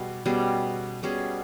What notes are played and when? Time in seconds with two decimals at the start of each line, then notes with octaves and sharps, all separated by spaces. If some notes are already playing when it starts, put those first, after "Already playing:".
Already playing: B2 G3 G#4
0.26 B2 G3 C#4 G#4
1.03 B2 G3 C#4 G#4